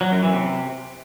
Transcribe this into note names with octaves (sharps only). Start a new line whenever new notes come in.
F#3
F#2
E3
C3